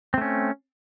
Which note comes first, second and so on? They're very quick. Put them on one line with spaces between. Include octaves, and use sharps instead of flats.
C4 A3 C#4